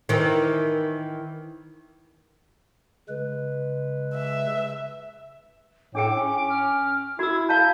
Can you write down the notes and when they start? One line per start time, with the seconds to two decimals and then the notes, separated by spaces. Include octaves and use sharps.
0.09 D#3 E3
3.09 C#3 G#3 B4
4.14 E5
5.95 A2 D4 G#4 G5 D6
6.16 C#4
6.50 F6
7.19 E4 F#4 E6 G#6
7.49 F5 A5 A#5 G6